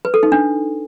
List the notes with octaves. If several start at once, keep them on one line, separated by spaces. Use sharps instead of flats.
B4
A4
D#4
D4